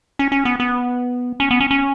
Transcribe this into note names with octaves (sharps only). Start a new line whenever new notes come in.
C#4
C#4
B3
B3
C#4
B3
C#4
C#4